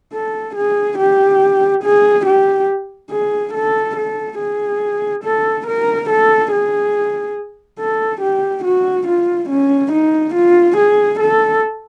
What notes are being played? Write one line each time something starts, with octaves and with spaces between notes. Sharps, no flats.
A4
G#4
G4
G#4
G4
G#4
A4
A4
G#4
A4
A#4
A4
G#4
A4
G4
F#4
F4
C#4
D#4
F4
G#4
A4